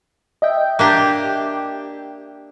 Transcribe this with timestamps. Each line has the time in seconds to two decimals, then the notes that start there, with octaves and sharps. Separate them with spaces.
0.42 D#5 E5 G5
0.79 A#3 D4 G4